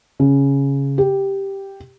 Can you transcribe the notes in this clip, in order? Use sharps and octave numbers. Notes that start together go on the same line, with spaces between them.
C#3
G4